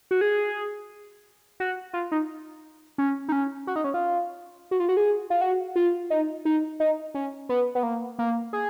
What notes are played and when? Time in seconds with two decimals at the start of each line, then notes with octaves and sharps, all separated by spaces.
0.11 F#4
0.21 G#4
1.60 F#4
1.93 F4
2.12 D#4
2.98 C#4
3.29 D#4
3.32 C#4
3.67 F#4
3.76 D#4
3.84 C#4
3.94 F4
4.71 F#4
4.80 F4
4.89 F#4
4.97 G#4
5.30 F4
5.41 F#4
5.76 F4
6.10 D#4
6.45 D#4
6.80 D#4
7.15 C#4
7.49 B3
7.75 B3
7.83 A#3
8.19 A#3
8.53 G#4